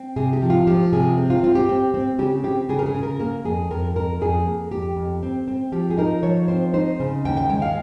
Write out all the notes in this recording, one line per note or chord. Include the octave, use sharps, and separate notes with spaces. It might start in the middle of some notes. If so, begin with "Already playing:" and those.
Already playing: C4
C3 G#4
G4
F3
F4
F3 G4
C3 G#4
C4
F4
C4 F4
G4
C4
C4
C#3 G4
C4 G4
C#3 G#4
A#4
G#4
C#3
A#4
A#3 A#4
F2 G#4
F2 A#4
F2 A#4
F2 G#4
A#3
F2 G4
F2
C4
C4
F3 G4
G#4
D#4 A#4
F3 C#5
C4 C5
D#4 C5
C#3
D#2 G5
G5
G#3 G5
F5